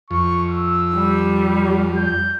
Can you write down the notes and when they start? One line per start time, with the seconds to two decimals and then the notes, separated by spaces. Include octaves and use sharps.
0.11 F2 C#6
0.49 E6
0.94 G3
1.97 G6